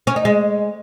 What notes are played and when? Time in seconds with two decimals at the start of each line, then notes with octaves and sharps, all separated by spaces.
0.07 C#4
0.16 D#4
0.25 G#3